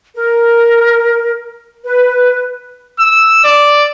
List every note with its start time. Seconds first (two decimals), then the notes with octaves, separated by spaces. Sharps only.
0.15 A#4
1.85 B4
3.00 E6
3.44 D5